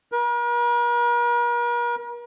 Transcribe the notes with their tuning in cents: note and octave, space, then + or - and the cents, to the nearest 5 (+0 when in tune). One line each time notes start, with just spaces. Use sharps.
A#4 +45